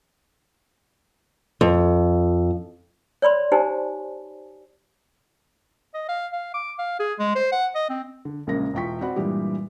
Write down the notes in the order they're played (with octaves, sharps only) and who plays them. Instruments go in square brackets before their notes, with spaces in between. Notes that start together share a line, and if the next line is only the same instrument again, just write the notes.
[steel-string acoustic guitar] F2
[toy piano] C#5 D5 B5 C6
D#4 G4 C5 G#5 A5
[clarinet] D#5
F5
F5
D6
F5
G#4
G#3
C5
F#5
D#5
C4
[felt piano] D3
A#1 C#3 G#3 A#3 A#6
E1 E4 F4 G5 C#6 B6
C4 F#4 D5 F#5 B5
G2 A#2 E3 G3 G#3 G4